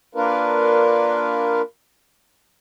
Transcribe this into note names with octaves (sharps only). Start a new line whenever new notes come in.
A#3 D4 F4 A#4 B4